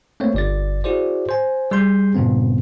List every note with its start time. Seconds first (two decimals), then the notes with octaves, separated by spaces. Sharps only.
0.20 A3 A#3 C4 C#5
0.34 G1 D5 A6
0.84 E4 F#4 G#4 C5 D5
1.29 C5 G#5
1.71 G3 G#4 C6 G6
2.15 G2 A#2 C#3 B3 C4